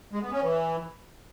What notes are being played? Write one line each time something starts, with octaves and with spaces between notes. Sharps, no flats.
G#3
B3
C#4
E3